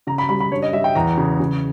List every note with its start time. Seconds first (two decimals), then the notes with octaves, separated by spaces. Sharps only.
0.07 C#3 A#5
0.18 B5
0.29 G3 B5
0.40 B5
0.51 G2 C#5
0.62 D#5
0.73 G3 E5
0.84 G5
0.95 E2 A#5
1.17 C#3
1.40 C#3